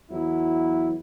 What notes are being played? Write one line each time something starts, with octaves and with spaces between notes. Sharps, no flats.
E2 F#3 E4